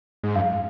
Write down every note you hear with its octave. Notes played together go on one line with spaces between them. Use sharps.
G#2
F#2 F5